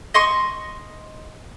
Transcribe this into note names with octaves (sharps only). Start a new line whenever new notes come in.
D#5 C6 C#6